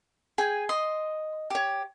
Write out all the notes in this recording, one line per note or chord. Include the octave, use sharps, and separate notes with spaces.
G#4 G5 G#5
D#5 C6
G4 C#5